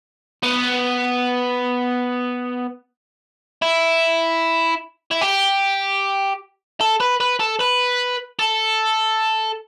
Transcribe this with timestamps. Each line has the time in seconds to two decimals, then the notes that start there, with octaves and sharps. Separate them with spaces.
0.43 B3
3.62 E4
5.11 E4
5.22 G4
6.81 A4
7.00 B4
7.20 B4
7.40 A4
7.61 B4
8.39 A4